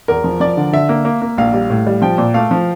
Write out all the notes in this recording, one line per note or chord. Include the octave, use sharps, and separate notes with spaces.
E2 A#4
F3
F3 D5
D3
D3 E5
A#3
A#3
A#3
A#1 F5
G3
A2
G3
F3 G5
A#2
A3 F5
F3